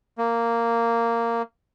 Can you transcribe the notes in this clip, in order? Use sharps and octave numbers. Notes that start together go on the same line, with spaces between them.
A#3